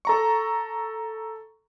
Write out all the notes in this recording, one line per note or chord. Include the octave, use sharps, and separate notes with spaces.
A4 A#5 C#6